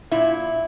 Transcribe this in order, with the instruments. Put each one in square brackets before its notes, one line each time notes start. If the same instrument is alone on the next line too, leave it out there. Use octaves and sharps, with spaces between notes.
[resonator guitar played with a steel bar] A#2 E4